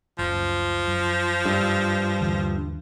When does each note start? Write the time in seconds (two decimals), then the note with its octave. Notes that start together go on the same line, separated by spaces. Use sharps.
0.19 F#1 C#2 F3
0.88 F#2
1.45 G2
2.20 D#2 D3 E3